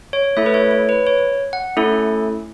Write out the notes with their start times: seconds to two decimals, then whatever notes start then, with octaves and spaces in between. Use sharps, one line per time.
0.13 C#5
0.37 A3 E4 A4 E5
0.46 B4
0.54 C#5
0.71 C#5
0.89 B4
1.07 C#5
1.53 F#5
1.77 A3 C#4 E4 A4